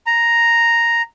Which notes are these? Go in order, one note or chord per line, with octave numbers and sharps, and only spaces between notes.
A#5